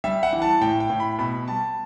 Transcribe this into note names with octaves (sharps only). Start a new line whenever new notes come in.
G3 E5
F#5
E3
A5
A2 G5
G5
A2
B5
B2 B5
G3 A5